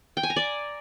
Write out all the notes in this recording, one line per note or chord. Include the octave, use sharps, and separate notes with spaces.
G5
G#5
A#5
D5